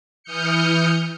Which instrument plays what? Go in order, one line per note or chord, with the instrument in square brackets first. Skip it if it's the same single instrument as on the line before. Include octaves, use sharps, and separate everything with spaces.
[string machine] E3 D#6 F6 G6 C#7